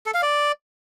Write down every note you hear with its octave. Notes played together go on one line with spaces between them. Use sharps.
A4
F5
D5